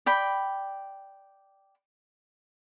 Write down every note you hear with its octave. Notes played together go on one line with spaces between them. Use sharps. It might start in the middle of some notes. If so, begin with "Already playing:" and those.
D5 G5 B5